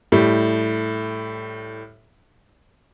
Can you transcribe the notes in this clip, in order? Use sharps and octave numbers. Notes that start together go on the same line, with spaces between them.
A2 G3